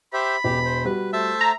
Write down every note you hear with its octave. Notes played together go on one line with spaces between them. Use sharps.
G4 C5 E5 B5
E1 G4
C5
G3 F#4 B4
A3 C5 E5 A5
A#5